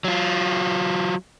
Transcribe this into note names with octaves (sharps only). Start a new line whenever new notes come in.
F#3 F4